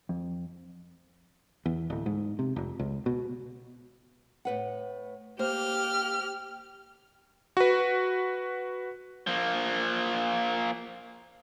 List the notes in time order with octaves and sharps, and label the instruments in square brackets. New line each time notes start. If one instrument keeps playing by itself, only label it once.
[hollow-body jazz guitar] F2
[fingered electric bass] E2
D1
G#2
C3
F1
C#2
B2
[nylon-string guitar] A2 B4 F#5
[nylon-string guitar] A#3 C5 [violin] G4 F6
[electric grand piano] F#4 B4
[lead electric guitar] F3 A#3